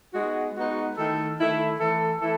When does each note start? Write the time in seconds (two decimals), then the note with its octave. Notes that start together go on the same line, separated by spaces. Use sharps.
0.14 G#3 B3 D#4 F#4
0.55 G#3 B3 D#4 F#4
0.96 D#3 A3 E4 A4
1.37 D#3 A3 E4 A4
1.78 E3 A3 E4 A4
2.20 E3 A3 E4 A4